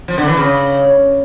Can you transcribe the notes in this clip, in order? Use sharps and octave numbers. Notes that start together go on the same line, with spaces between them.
F3
D3
E3
C#3